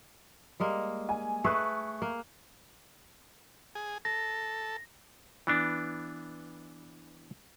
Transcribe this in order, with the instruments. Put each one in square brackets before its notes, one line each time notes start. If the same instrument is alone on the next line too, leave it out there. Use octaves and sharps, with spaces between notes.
[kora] G3 G#3 A#3
[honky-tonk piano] G#5
[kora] A3 G#4 B4 [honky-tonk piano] C#6 F#6
[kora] A#3
[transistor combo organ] G#4
[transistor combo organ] A4 [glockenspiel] A#6
[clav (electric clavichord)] E3 B3 D4